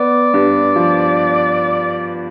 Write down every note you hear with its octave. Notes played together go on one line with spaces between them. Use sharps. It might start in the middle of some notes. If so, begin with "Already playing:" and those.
Already playing: B3 D5
G2
F3